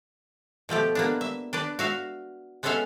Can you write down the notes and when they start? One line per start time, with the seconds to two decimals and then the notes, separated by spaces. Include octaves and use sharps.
0.69 B2 F3 A3 G4
0.95 A#3 B3 D4
1.21 E5
1.53 D4 B4 D5
1.79 F#4 E5 F5
2.63 G#3 B3 C#4 A4 E5 F5